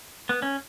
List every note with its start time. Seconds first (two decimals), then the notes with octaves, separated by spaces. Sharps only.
0.29 B3
0.42 C#4